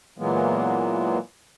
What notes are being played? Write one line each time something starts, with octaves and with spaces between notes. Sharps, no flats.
A#2 E3 F#3 G#3 A#3 B3